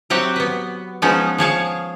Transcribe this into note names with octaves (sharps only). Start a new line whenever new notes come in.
F#3 C4 G4 F#5
B3 B4
F3 G#3 B3 C#4 D#4
F3 G#4 C#5 F5